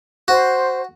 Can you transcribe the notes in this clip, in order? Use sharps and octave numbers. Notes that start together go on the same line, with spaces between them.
F#4 C5